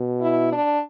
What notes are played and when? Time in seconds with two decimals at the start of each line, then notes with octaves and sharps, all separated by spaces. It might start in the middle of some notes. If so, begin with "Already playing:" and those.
Already playing: B2
0.21 E4
0.53 D4